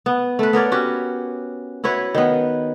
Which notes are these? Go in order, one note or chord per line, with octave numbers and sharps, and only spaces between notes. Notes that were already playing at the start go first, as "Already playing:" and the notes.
B3
A3 B4
B3 A#4 C#5 D5
C#4 F#4 G4
E4 F#4 B4 C#5
D#3 B3